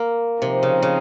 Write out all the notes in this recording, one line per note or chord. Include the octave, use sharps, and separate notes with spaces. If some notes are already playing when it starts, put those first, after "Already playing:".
Already playing: A#3
C3 F3 C4 D#4
C#3
C#3